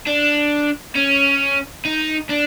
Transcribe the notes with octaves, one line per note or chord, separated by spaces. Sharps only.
D4
C#4
D#4
D4